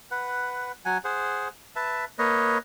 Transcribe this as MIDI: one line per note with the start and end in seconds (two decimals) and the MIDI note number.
0.11 0.72 71
0.11 0.72 78
0.85 0.98 54
0.85 0.98 78
0.85 0.98 80
1.04 1.48 68
1.04 1.48 72
1.04 1.48 78
1.76 2.05 71
1.76 2.05 76
1.76 2.05 81
2.19 2.58 58
2.19 2.58 71
2.19 2.58 73
2.19 2.58 75